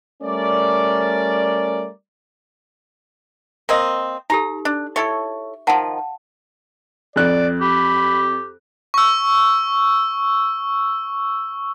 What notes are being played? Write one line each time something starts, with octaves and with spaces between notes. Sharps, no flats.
G3 A3 C#4 A#4 D5
A#3 C4 D#5
D#4 G4 A4 A#5
D4
E4 A4 C#5 E5 C#6
D#3 F3 F5 F#5 A5
F2 D5 F#6
G4 B5
C#6 E6